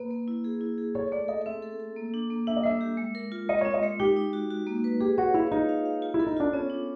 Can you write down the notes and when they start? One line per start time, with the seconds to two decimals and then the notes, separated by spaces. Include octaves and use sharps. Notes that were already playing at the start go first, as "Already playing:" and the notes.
Already playing: A#3 B4
0.11 A#3
0.28 E4
0.44 G#4
0.61 E4
0.78 G#4
0.95 A4 C#5
1.12 A3 D5
1.28 A4 D#5
1.46 C4 E5
1.62 A4
1.80 A4
1.96 A#3
2.14 D4
2.30 A#3
2.47 D4 E5
2.57 D#5
2.63 G3 E5
2.81 G4
2.97 G#3
3.15 A#4
3.32 F4
3.49 G#3 D#5
3.61 C4 C#5
3.74 D#5
3.83 G#3
4.00 D#4 G4
4.16 D#4
4.33 F#4
4.51 F#4
4.67 A#3
4.84 B4
5.01 G4 G#4
5.18 F#4 C#5
5.34 E4 F5
5.52 D#4 F4
5.69 F5
5.85 F5
6.02 F4
6.14 E4
6.20 A4
6.27 D#4
6.36 D4 F4
6.53 B3 C#4
6.70 D4